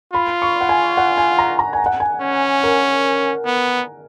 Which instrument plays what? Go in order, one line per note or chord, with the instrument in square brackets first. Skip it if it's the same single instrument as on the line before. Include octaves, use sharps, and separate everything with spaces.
[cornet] F4 [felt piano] B5
[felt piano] C#6
F#5
G#5
F#5
G#5
A#5
A#5
G#5
F#5
G#5
[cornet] C#4
[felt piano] A#4
[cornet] B3